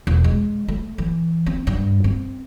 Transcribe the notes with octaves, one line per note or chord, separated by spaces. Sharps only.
E1
G#3
A3
E3
C4
G2
C4